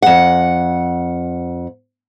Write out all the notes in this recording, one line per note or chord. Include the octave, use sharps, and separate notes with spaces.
F2 F#5